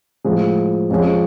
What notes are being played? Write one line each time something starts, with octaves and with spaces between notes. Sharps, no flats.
A2 F3 G#3
F2 F3 G#3 C#4